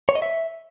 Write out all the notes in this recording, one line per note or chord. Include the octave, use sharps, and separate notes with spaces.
C#5
D#5
E5